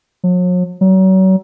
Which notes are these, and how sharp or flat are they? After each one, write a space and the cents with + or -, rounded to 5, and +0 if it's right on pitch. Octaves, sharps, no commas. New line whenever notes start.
F#3 -45
F#3 +35